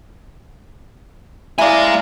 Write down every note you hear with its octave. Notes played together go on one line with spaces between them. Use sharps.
G#3 E4 D5 F5 G#5 A#5